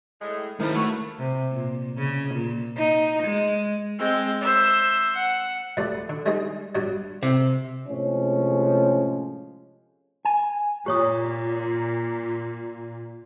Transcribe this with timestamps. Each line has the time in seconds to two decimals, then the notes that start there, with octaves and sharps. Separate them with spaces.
0.21 A2 G#3
0.60 C3 D#3 F3 G#3 E4 A#4 B5
0.74 A3 F#4 B4 C#5
1.18 C3
1.51 A#2
1.98 C#3
2.35 A#2
2.77 D#4
3.23 G#3
3.98 G#3 C4
4.41 C5 E5
5.16 F#5
5.77 F2 C3 A3 B4 D5
6.09 D3
6.26 G3 G#3 C4 D#4 G#4
6.75 G2 F#3 G3 B3
7.23 C3
7.87 A2 C3 F3 G#3 C#4
10.25 G#5
10.86 A#2 G4 C#5 D#6